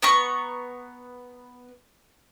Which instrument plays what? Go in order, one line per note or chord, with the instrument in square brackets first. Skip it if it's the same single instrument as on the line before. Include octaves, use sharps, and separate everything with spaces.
[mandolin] B3 A#5 C#6